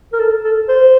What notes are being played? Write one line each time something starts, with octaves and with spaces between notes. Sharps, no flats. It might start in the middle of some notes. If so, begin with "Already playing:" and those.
A#4
A4
A4
C5